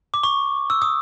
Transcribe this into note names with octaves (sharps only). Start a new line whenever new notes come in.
D6
C#6
E6
D#6